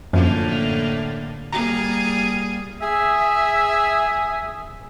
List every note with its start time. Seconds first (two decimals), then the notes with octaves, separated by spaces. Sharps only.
0.13 F#2 A2 D3 F3 A#3
1.53 G3 A#3 G#4 A#5
2.82 G#4 E5